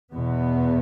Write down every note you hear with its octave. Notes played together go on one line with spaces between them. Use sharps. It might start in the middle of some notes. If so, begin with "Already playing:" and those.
E2 B2 B3